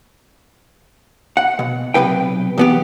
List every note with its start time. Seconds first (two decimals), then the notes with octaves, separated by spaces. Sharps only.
1.37 F#5
1.59 B2
1.94 B1 E2 C3 B4 G5
2.58 E2 B3 G4